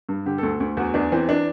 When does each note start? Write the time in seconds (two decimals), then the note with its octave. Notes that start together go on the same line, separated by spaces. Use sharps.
0.09 G2
0.26 D3 G4
0.38 D2 A4
0.60 D2
0.77 E2 F#4
0.94 E2 D4
1.12 E3 C4
1.29 D4